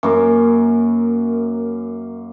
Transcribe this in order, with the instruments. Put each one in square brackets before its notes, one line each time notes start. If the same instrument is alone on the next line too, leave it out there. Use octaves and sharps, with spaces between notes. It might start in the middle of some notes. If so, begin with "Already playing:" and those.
[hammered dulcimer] F#2 A#3 A#4